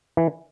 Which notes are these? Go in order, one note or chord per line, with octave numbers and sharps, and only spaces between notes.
E3